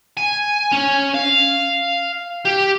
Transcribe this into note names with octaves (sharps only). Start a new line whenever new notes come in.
G#5
C#4
F5
G4